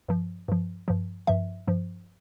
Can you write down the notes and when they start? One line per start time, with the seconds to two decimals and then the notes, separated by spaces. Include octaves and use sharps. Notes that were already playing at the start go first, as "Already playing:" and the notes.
0.08 G2 F3
0.48 G2 F3
0.88 G2 F3
1.27 G2 F3 E5
1.68 G2 F3